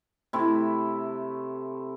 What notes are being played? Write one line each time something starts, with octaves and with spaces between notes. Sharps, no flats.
C3 A3 E4